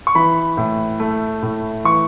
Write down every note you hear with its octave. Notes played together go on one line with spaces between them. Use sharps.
C#6
E3 B5
A2
A3
A2
E3 C#6